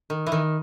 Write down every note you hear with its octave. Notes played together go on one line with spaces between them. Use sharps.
D#3
E3
D#3